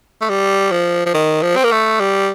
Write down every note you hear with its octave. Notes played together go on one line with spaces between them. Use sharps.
A3
G3
F3
F3
D#3
F3
C4
A#3
A3
G3